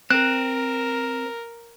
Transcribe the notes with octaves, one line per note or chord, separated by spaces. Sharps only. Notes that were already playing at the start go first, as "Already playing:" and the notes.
C4 A#4 F#6